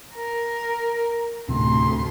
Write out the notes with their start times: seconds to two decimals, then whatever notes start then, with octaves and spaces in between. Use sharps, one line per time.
0.15 A#4
1.49 D1 D2 C3 C6